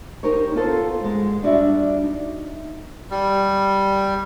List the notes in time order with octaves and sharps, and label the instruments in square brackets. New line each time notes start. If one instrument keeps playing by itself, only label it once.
[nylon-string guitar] D#4 G4 A#4 C5 C#5
B3 F4 A4 C5
G#2 G#3
G3 D4 F#4 E5
D#4
[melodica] G3